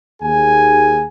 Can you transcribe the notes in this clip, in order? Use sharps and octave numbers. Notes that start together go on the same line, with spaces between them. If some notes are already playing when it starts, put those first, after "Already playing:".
D#2 G#4 G#5